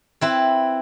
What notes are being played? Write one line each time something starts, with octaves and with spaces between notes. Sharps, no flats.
C4 E4 B4